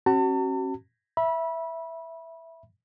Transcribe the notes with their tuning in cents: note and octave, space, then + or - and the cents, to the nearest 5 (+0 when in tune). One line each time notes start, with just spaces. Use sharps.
C#4 -40 F#4 +30 A5 +40
E5 +0 B5 -25